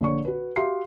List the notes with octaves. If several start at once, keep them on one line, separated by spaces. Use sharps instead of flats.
A#1 A#2 D3 C#5 C#6
F#4 B4
F#4 G4 E5 F5 C6 C7